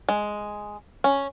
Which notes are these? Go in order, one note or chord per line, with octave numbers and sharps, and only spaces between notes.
G#3
C#4